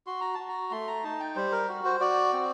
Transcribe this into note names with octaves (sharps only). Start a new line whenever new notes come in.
F#4 C6
A#5
F#4 A5
A#5
A3 C6
A#5
D#4 A5
G5
G3 C5
A#4
F#4
C5
F#4 D5
C4